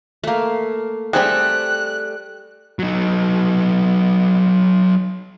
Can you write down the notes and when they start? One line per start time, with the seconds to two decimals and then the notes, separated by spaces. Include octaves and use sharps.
0.24 A3 A#3
1.13 G3 A3 C4 G#4 A4 F#6
2.79 F#3 D#4